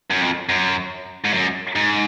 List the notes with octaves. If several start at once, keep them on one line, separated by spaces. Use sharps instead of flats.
F#2
F2
F#2
G#2
F#2
G#2